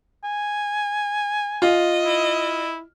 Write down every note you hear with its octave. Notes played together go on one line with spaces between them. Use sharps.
G#5
F4 D#5
E4